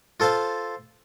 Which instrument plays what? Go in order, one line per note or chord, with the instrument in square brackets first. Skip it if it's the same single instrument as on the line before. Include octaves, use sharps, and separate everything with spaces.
[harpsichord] F4 A4 C5 F5 A5